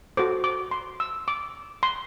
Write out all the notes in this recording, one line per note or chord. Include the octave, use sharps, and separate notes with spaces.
F#4 A4 C5 D6
D6
C6
E6
D6
C6